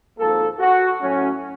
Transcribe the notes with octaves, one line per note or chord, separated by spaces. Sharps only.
G#1 G#2 F3 A#3 A4
F#4
A2 F#3 A3 C#4